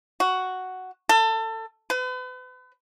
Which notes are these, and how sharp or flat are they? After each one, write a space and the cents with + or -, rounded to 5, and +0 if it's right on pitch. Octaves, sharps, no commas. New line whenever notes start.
F#4 +5
A4 +25
B4 +40